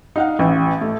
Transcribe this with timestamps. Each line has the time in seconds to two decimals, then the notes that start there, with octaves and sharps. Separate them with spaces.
0.16 D#4 F5 F#5
0.39 A1
0.81 A3